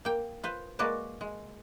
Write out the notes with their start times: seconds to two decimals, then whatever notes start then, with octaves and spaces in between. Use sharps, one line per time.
0.05 A#3 G5
0.44 F4 B4 C5
0.79 G#3 A#3 F#4 B4 D5 A5
1.21 G#3